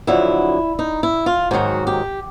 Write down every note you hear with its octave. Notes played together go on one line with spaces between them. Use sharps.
F2 D3 F#3 E4
D#4
E4
F4
G#2 D#3 F#3 F#4
G4